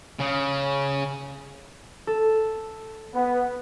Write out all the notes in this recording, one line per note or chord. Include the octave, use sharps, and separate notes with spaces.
C#3
A4
B3